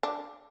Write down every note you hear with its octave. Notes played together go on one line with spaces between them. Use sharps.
D4